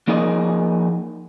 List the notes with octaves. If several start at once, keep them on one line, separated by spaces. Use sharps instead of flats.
F3 A#3 D#4 G#4 A#4 D#5